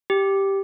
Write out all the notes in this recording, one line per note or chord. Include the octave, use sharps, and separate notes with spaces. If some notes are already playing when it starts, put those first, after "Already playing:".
G4